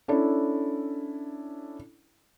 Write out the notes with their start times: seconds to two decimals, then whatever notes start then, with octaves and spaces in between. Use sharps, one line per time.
0.08 C#4 D4 E4 A4